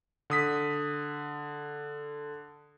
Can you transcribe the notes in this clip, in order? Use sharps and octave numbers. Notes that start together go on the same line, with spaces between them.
D3 D#6 B6